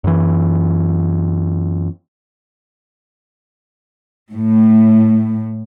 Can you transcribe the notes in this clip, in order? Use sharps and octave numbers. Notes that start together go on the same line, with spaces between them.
F#2 E3
A2